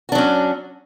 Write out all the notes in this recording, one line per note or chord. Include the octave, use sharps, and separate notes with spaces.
F#3 C#4 D4 F#4